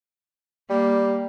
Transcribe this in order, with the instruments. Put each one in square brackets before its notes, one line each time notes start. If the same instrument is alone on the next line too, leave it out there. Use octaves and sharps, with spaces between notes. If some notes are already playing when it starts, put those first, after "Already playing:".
[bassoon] G3 [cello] A#3